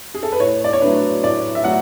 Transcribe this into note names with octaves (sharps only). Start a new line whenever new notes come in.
G#4
A4
B4
A2 C#5
D5
C#5
F#3 A3 D4 B4
A2 D5
E5
F#3 A3 F#5